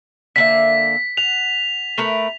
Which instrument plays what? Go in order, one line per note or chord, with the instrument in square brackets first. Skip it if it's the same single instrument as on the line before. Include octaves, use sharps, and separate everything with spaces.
[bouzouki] D3 A#3 E5 [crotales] B6
[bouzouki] F#5 [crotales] F7
[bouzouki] A3 A#4 B4